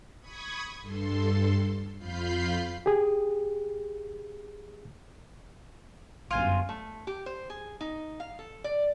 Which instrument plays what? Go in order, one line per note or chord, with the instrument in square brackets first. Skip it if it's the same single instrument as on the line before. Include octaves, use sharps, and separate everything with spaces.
[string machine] B5 C#6 D#6 G#6
G2 A4 C6
F2 F4 F5 B5 G6 C7
[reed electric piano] G4 G#4
[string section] G1 F#2 [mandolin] F4 G#5
[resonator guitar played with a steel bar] A3
G4
C5
G#4
D#4
F5
A4
D5